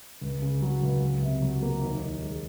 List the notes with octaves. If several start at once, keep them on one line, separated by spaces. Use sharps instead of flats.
C#2
C#3
F#3
C#2
C#2
C3
F#3
A#3
D#2
D#3
G#3